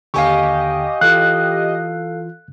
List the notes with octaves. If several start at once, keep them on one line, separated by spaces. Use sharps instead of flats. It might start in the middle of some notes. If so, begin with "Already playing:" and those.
D#2 D3 G4 D#5 F5 G#5 C#6
E3 F4 A4 F5 F#6